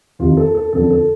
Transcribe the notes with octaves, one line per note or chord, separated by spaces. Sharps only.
F2 C3 D#3 F4
A4
A4
F2 D3 F3 A4
A4